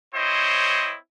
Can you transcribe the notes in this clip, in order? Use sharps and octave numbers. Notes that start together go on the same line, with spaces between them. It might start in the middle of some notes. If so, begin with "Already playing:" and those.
C4 E4 C5 C#5 D#5